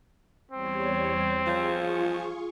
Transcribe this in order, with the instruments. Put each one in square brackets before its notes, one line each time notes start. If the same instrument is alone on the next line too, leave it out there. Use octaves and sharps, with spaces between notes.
[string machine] E2 G3 C#5 [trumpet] C4
[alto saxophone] F3 [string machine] F4 G#4 C#6